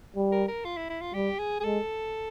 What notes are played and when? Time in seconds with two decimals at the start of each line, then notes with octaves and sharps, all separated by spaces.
0.16 G3
0.32 A#4
0.48 A#4
0.65 F4
0.77 E4
0.90 E4
1.02 F4
1.14 G3 G4
1.39 G#4
1.60 G#4
1.64 G#3 A4